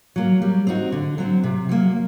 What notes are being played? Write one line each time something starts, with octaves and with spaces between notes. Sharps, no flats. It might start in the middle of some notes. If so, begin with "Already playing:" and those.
F#3 A#3
G3
C4 D#4 F#4
D3
F#3 C4
C3
F#3 A#3